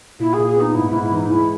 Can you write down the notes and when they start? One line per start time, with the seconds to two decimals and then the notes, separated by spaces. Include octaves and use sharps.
0.19 A#2 E4
0.33 G#4
0.38 A#2
0.47 G#4
0.56 B3 D#4
0.74 G#2 E4
0.89 G#2 E4
1.03 E4
1.12 E3 D#4
1.30 G#3 E4